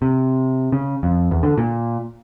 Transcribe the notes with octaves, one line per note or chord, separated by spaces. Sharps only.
C3
C#3
F2
E2
D3
A#2